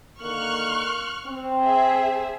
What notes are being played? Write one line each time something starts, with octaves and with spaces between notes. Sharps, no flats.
D3 D#3 A#3 C#6 F6 F#6
C4
G#4 E5